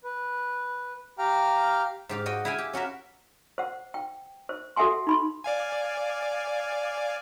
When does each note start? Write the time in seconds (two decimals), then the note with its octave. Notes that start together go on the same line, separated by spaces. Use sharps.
0.04 B4
1.18 G4 F5 G5 A#5 F6
2.09 G#2 G4 F5
2.26 F#4 D#5 G5
2.45 E4 E5 F5 G5 G#5
2.58 G4
2.73 C#4 F#4 A#4 E5
3.58 C5 F#5
3.94 G5
4.49 C5
4.76 F#4 A4 E5 F#5 G#5 C6
5.07 D#4 B5 C6
5.44 D5 F5 G#5